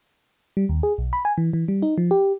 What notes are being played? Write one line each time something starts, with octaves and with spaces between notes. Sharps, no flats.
G3
D#2
G#4
B1
B5
G#5
E3
E3
G3
D#4
F3
G4